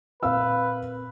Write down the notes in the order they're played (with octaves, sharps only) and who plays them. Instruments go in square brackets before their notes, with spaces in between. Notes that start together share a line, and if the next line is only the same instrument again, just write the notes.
[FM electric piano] A#2 C4 A#4 [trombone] B4 [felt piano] F5 E6